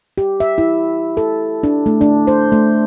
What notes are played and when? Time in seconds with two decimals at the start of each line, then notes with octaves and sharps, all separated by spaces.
0.18 G4
0.40 E5
0.58 E4
1.17 A4
1.63 D4
1.86 A3
2.01 D4
2.27 C5
2.52 A3